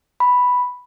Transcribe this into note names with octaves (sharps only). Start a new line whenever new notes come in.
B5